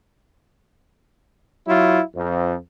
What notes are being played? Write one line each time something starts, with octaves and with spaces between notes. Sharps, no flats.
F#3 E4 F4
F2